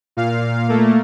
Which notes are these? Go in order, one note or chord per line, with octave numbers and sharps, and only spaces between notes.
A#2 F5
A3 A#3